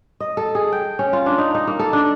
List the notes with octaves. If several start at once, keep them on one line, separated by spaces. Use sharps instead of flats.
D#5
A4
G#4
G5
C#4
F4
D4
D#4
D#4
A#3
A4
D4